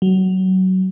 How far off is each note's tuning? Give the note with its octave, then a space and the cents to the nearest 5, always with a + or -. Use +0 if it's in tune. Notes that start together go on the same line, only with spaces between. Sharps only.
F#3 +20